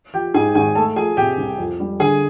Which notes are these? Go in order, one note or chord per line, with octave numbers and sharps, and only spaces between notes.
F3 G4 G5
G#2 G#4 G#5
G#1 G#4 G#5
A3 A4 A5
F3 G#4 G#5
C3 G4 G5
C2
F2
G3
D3 G#4 G#5